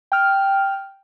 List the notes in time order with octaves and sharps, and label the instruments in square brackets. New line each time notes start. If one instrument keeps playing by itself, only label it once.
[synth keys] G5 F6